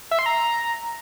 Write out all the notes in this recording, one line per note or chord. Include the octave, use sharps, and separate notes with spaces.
E5
C6
A#5